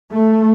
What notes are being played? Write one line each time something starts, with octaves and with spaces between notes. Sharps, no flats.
A3